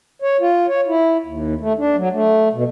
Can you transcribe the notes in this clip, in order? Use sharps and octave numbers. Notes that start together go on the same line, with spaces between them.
C#5
F4
C#5
E4
D#2
A3
D4
F#3
A3
B2